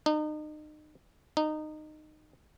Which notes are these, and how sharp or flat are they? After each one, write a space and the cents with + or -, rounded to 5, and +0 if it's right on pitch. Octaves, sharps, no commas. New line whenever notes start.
D#4 -35
D#4 -20